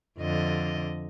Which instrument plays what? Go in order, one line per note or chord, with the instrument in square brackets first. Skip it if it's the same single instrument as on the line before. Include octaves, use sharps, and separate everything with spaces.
[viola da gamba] F2 D3 D#5